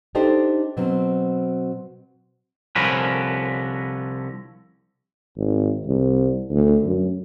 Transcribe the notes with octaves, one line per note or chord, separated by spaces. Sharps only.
D4 D#4 G4 A4 C5
B2 F#3 C4
C2 D3 F3 C#4 A#4 B4
G#1
C2
D2
F#2